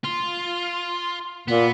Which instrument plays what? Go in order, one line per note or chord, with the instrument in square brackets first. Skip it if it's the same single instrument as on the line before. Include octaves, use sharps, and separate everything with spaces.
[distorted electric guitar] F4
[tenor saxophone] A#2 [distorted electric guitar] B3